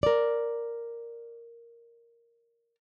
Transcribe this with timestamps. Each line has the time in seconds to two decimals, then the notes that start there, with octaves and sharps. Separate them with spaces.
0.03 A#4 D5